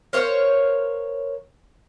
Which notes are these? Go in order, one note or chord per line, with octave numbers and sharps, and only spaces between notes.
A#4 C5 C#5 F5